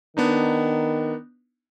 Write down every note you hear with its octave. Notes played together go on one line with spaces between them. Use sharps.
D#3 B3 D4 D#4